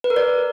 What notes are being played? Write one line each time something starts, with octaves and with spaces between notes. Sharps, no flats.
B4
A#4
D5